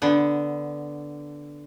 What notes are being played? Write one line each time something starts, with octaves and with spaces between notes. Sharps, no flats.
D3 B3